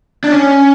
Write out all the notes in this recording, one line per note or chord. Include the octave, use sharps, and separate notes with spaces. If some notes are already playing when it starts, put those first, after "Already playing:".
D4
C#4